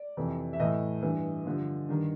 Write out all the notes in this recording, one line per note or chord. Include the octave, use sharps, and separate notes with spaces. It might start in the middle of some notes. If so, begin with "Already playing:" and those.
Already playing: D5
F2 C3 E3
E5
A2 E3 D#5
G2 E3
G2 D3 F3
G2 D#3